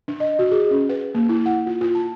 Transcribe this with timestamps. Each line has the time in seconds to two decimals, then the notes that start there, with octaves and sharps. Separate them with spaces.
0.08 D4
0.20 D#5
0.39 F#4
0.51 G#4
0.71 C#4
0.89 B4
1.15 A#3
1.29 E4
1.46 F#5
1.67 F4
1.81 F4
1.95 A5